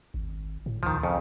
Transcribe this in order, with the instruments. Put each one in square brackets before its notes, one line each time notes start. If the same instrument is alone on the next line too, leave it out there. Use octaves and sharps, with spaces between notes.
[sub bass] G#1
A2
[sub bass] D2 [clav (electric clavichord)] D#3 F3
[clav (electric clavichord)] F2 C#3